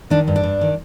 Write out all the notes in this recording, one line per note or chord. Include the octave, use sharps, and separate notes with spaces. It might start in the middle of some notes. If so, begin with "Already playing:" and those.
D#3 D4
G2
D4
G2
D#3